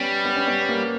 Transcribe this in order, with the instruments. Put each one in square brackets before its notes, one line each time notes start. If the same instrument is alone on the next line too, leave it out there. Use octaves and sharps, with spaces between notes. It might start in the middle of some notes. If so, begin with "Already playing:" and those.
Already playing: [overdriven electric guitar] G3 [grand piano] B3 C#4
[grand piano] B3
C#4
B3
A#3